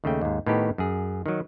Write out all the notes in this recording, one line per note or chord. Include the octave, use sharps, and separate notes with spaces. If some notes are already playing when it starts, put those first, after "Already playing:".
D#2 C#3 A3 G5
D#2 G#2
A2 D#3 B3 D#4 G4
F#2 G#4
D#3 F#3